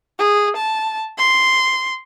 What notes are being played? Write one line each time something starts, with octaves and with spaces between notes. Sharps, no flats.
G#4
A5
C6